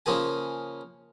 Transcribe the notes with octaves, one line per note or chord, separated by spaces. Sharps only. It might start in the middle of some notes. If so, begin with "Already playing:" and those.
C#3 F3 A#3 G#4 G#5